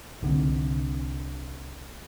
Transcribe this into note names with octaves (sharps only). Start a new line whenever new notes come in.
C2 D3 F#3 C4